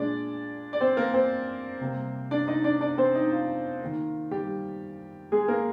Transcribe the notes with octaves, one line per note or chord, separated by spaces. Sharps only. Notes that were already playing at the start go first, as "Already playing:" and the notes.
Already playing: A#2 G#3 D4 D5
D5
C4 C5
A#3 A#4
C4 C5
C3 G3 A#3
D4 D5
D#4 D#5
D4 D5
D4 D5
C4 C5
D#4
F4
D#3 A#3
G3 G4
G#3 G#4
A#3 A#4